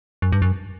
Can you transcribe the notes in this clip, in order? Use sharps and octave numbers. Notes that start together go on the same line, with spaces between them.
F#2
G2
F#2